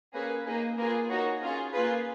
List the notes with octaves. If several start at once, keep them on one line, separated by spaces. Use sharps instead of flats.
A#3 C#4 G#4 B4
A#3 D#4 G#4
A#3 F4 G#4 B4
A#3 D#4 F#4 C#5
C#4 F4 G#4 A#4
A#3 F4 G#4 B4